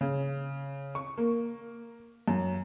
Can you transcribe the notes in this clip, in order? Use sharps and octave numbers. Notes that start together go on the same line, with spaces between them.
C#3
C#6
A#3
F#2